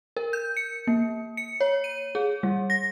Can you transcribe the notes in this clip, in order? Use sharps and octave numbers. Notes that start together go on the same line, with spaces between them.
A#4
G6
C#7
A#3
C#7
C#5
D#7
G#4
G3
A#6